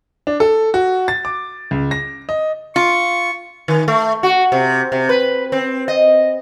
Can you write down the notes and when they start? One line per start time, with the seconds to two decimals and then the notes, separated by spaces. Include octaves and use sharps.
0.27 D4
0.40 A4
0.74 F#4
1.08 A6
1.25 D6
1.71 C#2
1.91 A#6
2.29 D#5
2.76 F4 C#6
3.68 D#3
3.88 A3
4.23 F#4
4.52 C3
4.92 C3
5.09 B4
5.52 C4
5.88 D#5